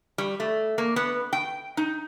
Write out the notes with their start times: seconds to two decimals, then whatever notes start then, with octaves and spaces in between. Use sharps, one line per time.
0.18 G3
0.40 A3
0.78 A#3
0.96 B3
1.33 G5
1.77 D#4